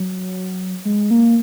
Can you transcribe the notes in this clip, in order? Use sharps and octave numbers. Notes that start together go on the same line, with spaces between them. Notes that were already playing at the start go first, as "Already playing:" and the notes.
Already playing: F#3
G#3
A#3